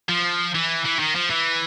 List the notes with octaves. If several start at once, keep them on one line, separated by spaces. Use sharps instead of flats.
F3
E3
E3
D#3
F3
E3